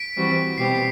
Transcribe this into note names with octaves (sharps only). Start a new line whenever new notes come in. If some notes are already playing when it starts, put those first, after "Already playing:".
Already playing: B6 D7
E3 G3 C4 F#4
B2 G3 C4 G4 C7